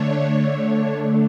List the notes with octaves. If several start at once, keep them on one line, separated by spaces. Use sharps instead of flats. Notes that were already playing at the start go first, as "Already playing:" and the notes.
Already playing: D3 A3 D4 C#5